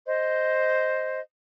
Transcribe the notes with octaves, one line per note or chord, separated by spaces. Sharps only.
C5 D#5